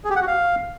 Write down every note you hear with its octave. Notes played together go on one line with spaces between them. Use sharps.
G#4
G4
F#5
F#4
F5